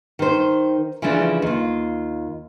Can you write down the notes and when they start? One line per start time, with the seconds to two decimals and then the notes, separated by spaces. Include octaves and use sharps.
0.19 D#3 C5
1.02 C#3 E3 F3 A3 D4
1.42 D#2 F4